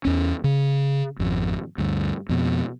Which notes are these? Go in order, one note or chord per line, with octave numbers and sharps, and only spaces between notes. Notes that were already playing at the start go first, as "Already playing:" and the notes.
E2 C#4
C#3
G#1 F2
D2 G2
F2 B2